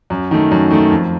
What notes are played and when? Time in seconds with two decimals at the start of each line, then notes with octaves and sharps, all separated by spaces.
0.10 F#2
0.31 D#3 A3
0.51 F#2
0.71 D#3 A3
0.91 F2